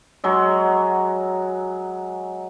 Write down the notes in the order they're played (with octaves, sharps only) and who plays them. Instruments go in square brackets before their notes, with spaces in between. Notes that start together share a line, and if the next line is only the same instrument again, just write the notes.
[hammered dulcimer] F#3 G#3